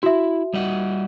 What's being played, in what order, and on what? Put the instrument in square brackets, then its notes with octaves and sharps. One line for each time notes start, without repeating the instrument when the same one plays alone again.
[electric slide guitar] E4 [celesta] F#4 E5
[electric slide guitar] G3 D#5 F#5